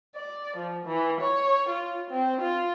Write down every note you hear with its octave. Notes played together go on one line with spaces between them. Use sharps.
D5
F3
E3
C#5
F4
C4
F4